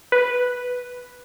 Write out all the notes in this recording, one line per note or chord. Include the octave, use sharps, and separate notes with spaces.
B4